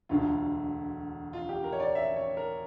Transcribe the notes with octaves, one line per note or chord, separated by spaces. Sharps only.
E1 D2 D3 F4
F4
G4
A#4
C#5
D5
E5
C#5
A#4